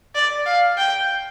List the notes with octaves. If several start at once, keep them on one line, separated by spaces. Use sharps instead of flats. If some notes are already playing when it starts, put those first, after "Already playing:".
D5
F5
G5